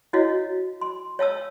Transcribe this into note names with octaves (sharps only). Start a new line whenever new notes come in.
E4 F#4 C#5 D#5 F5 F#5
C6
C#5 F5 A5 E6